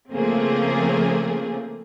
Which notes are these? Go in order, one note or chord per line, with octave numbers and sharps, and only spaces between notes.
C#3 F3 A3 A#3 C4 G#4